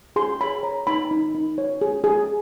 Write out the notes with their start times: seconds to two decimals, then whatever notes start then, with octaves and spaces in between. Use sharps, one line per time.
0.16 G#4 C6
0.40 C#5 B5
0.63 C#5 A#5
0.87 D#4 B5
1.11 D#4
1.35 D#4
1.58 C#5
1.81 G#4
2.04 G#4